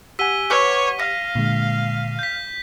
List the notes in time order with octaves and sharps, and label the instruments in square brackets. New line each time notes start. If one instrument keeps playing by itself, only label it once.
[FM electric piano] G4 F#5 [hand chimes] G#5 E6 [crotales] B6 D#7 G7
[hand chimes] B4 C#6 D6 [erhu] C#5
[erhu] F5 [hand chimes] A#6
[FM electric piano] A#2 D3 G#3
[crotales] G6 B6